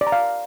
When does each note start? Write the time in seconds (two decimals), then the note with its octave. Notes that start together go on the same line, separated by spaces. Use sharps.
0.01 D5
0.07 A#5
0.12 F5